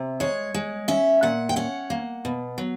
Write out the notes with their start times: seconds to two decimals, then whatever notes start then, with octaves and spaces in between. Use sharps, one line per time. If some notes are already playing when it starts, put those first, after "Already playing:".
Already playing: C3
0.20 G#3 C#5
0.54 G#3
0.88 C#4 E5
1.23 A#2 F#5
1.49 G5
1.56 C#4 F#5
1.90 A#3
2.25 B2
2.58 F#3